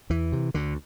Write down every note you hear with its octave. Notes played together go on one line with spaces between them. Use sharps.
E2 E3
C3
D2 D3